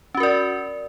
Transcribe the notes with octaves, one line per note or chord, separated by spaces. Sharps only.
C#4 F#4 A#4 D5